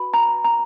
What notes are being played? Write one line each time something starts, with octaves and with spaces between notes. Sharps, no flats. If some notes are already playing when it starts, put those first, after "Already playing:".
Already playing: F#4 B4 B5
A#5
A#5